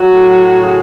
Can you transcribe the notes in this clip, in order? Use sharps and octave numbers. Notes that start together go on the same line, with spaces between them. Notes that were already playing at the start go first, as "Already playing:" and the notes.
Already playing: F#3 F#4
A2
C#3